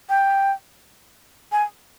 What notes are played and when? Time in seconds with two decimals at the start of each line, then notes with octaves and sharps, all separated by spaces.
0.10 G5
1.52 G#5